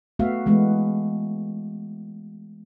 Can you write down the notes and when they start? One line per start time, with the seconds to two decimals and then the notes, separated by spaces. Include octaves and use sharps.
0.19 A3 B3 F#4 E5 F5
0.46 E3 G#3 A3 B3